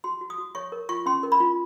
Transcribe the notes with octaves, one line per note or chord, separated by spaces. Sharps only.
F#4 C6
F#4
D#6
F#4
C#5 C#6
A#4
F4 C#6
C#4 C6
A#4
B5
F4